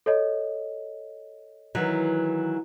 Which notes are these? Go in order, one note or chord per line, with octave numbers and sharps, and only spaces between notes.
A4 C#5 D#5
D#3 E3 F#3